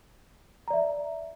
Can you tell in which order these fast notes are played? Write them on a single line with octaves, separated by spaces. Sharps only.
A#5 D5 E5